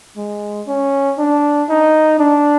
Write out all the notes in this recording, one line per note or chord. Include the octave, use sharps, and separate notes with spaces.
G#3
C#4
D4
D#4
D4